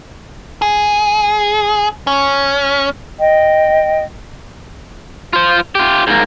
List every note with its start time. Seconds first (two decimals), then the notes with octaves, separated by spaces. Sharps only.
0.62 G#4
2.07 C#4
3.16 D#5 G5
5.33 F4 C5
5.75 F4 G4
6.07 G#2 A#3